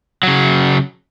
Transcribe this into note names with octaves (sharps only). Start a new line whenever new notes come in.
C#3 F#3